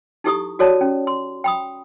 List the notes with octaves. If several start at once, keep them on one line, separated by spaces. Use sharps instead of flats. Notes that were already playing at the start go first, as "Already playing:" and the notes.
D#4 E4 G4 A4 C#6 D#6
F#4 A4 C#5 D5 A5
C#4
C6
G5 B5 D#6